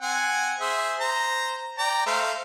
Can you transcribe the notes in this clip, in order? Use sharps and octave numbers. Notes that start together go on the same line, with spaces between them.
C4 F#5 G#5
G#4 C5 E5
C5 A#5
D5 G5 A#5
A3 C5 F5